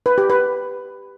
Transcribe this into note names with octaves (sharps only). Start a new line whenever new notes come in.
B4
G4
B4